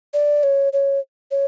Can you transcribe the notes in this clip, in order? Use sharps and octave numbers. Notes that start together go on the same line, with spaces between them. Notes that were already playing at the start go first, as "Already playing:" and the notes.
D5
C#5
C#5
C#5